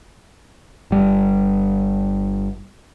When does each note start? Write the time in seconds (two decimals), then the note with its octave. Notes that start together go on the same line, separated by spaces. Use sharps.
0.91 G1 G3